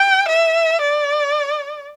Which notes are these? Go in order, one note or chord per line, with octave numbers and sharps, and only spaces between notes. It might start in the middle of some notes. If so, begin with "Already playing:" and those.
Already playing: G5
E5
D5